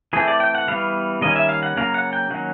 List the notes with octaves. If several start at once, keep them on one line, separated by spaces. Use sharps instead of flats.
E3 A3 C4 G#4
D5
G5
F#5
E3 G3 B3 F5
D#3 G3 A#3 C#4 D#5
E5
F5
F#5
C#3 F#3 A#3 C#4 F5
F#5
G5
D#3 F#3 A#3 C#4 F#5